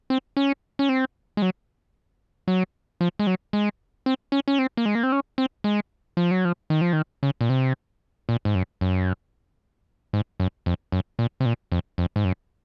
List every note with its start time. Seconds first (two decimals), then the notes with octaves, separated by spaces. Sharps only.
0.10 C4
0.37 C#4
0.79 C#4
0.89 C4
1.37 G#3
1.42 F#3
2.48 F#3
3.01 F3
3.19 G#3
3.27 F#3
3.53 G#3
4.06 C4
4.32 C#4
4.48 C#4
4.59 C4
4.77 A#3
4.86 G#3
4.95 A#3
5.03 C4
5.12 C#4
5.38 C4
5.64 G#3
6.17 F3
6.31 F#3
6.45 F3
6.70 D#3
6.81 F3
6.93 D#3
7.23 C#3
7.41 A#2
7.49 C3
8.29 A#2
8.45 G#2
8.55 F#2
8.81 F#2
10.13 G#2
10.40 F#2
10.66 F2
10.92 F#2
11.19 A#2
11.40 C3
11.46 A#2
11.72 F2
11.98 F2
12.16 G#2
12.25 F#2